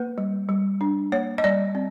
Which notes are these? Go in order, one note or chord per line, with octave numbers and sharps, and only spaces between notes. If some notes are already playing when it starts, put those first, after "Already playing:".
Already playing: A#3 B4
G3
G3
D4
A#3 C#5
D#5
G3 D5
C4